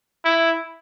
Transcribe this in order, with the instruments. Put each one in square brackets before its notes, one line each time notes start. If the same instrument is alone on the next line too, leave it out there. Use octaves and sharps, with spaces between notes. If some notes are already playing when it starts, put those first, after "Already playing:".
[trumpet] E4